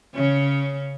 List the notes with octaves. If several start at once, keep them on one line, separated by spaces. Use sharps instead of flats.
C#3 C#4